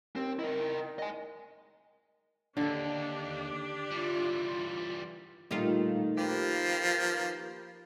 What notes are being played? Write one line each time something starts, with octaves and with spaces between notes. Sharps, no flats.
D#2 C4
D#3 E4 A#4
D#5 G#5
D#2 D3 D4 G4 A4
E3 G3 F4
A#2 D#3 G3 A3 D#4 F4
F3 A#3 G4 B4